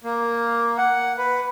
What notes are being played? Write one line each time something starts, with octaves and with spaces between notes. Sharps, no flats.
A#3
F#5
B4